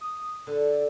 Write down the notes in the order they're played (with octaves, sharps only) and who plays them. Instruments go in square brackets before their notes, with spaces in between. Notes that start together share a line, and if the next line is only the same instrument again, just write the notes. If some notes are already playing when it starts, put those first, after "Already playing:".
[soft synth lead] D#6
[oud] D3 [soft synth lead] A4